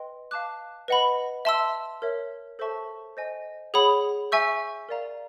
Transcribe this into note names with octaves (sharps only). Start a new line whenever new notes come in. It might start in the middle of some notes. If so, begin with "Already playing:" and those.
Already playing: B4 D#5 G5 C6
F5 A5 D6 F#6
B4 D#5 F#5 B5
E5 A5 C6 E6
A#4 C#5 E5
A4 C5 E5 A5 C#6
C5 D#5 G#5
G#4 C#5 F#5 B5 D#6
E5 G#5 C#6 E6 G6
A#4 D5 F5 A#5